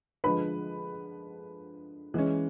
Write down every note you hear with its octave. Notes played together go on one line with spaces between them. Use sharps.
D3 F3 G#3 B4 B5
E3 G#3 C#4